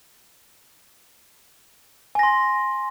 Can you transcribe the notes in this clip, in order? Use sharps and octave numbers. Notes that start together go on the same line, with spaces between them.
G#5 C6 A#6